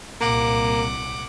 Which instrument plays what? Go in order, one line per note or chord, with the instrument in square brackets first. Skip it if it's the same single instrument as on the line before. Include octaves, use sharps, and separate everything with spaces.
[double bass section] C2 A#2 [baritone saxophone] A#3 [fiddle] F#5 D6